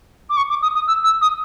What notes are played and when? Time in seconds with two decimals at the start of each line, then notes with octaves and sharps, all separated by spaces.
0.30 D6
0.37 C#6
0.50 D6
0.62 D#6
0.75 D#6
0.87 E6
1.04 E6
1.22 D#6